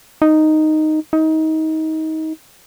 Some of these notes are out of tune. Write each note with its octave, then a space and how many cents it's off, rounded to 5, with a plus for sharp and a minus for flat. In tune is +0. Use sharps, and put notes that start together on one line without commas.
D#4 -5
D#4 +25